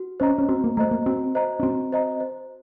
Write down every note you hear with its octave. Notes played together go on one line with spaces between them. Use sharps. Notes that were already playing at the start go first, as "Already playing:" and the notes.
Already playing: F#4
C#4 C5 D#5 A#5
C#4
C4 F#4
A#3
A3 C5 D#5 A#5
A#3
C4 F#4
C5 D#5 A#5
C#4
C4 F#4
C5 D#5 A#5
C5